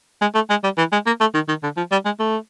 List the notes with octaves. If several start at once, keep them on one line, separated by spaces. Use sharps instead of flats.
G#3
A3
G#3
G3
E3
G#3
A#3
A3
D#3
D#3
D3
F3
G3
G#3
A3